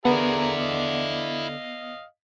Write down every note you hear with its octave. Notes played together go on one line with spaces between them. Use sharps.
D3 B3 E4 G#4 A#4 F5 F#5
D#5 F5